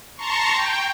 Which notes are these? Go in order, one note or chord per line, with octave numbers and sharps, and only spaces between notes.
A5 A#5 C6 C#6
G5